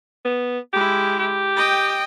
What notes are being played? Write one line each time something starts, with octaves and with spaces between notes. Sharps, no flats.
B3
G#3 E4 G4
G4
D#5 G5